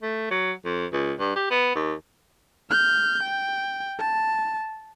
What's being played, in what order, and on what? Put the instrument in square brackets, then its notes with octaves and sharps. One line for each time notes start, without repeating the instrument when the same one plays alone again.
[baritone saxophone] A3
F#3
F2
C#2
G2
G4
B3
D#2
[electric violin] F6 G6
G5
A5